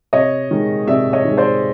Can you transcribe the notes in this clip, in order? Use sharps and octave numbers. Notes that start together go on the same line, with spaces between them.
C3 C#5 D#5
D#3 G#3
C3 D5 E5
C#5 D#5
D#3 G#3
C5 D5